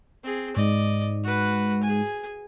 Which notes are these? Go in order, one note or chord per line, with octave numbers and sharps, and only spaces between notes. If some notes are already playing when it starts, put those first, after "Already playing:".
C4 G#4
G#2 D5 D#5
F#4 B4
G#4 G#5